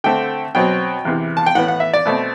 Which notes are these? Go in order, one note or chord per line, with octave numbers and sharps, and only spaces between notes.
D3 A3 C4 G5
B2 F#3 C4 G5
E2 C3 E3
A5
G5
A2 E3 B3 F#5
F#5
E5
D5
B2 A3 C4